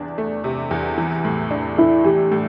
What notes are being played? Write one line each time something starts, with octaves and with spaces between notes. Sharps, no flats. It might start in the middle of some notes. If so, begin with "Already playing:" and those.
Already playing: E2 C3 D4
A3
C3
E2
E3
A2
D4
A3 E4
E3 G4
A2